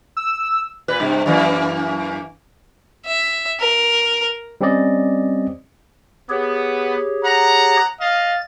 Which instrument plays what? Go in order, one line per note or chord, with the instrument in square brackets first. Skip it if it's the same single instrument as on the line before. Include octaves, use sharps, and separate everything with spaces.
[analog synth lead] E6
[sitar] A#2 B4
G2 C3
F#2 E3 A#3
[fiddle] E5
A#4
[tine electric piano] G3 C4 C#4 G4 D5 D#5
[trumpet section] B3 [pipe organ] G4 G#4 C#5
[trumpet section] F#5 A#5
[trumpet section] D#5 F5 [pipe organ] A6